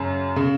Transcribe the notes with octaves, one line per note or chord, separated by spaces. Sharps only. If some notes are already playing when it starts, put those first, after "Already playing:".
Already playing: F#2 C#3
C#3